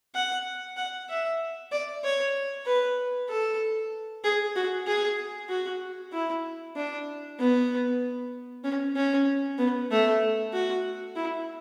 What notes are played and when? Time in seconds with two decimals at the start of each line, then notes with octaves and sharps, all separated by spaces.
0.15 F#5
0.77 F#5
1.09 E5
1.71 D5
2.04 C#5
2.66 B4
3.29 A4
4.24 G#4
4.56 F#4
4.87 G#4
5.49 F#4
6.12 E4
6.76 D4
7.39 B3
8.64 C#4
8.96 C#4
9.58 B3
9.91 A3
10.53 F#4
11.16 E4